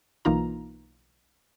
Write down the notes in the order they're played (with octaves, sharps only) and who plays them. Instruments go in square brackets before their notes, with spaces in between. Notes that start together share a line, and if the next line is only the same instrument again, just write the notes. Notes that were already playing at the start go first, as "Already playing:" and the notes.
[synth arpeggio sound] B1 E3 A#3 D#4 F4 A#5